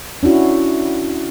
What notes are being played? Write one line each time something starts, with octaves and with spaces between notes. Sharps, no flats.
C#4 D4 E4 F#4